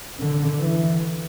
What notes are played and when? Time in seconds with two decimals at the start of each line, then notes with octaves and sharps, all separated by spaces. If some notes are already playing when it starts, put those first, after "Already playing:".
0.20 D3
0.60 E3